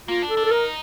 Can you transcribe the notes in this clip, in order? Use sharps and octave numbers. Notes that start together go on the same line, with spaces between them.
A#3 F4
D4
A4
D4
A4
D#4 A#4